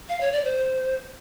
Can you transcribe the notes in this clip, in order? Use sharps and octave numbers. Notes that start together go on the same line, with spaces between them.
F5
C#5
D5
C5